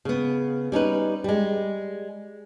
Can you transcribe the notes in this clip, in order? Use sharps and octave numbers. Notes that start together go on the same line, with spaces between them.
C#3 B3
G3 C#4 D#4 B4
G3 G#3